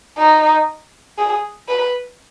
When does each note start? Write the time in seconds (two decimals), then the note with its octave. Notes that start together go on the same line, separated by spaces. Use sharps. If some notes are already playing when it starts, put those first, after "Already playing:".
0.18 D#4
1.18 G#4
1.68 B4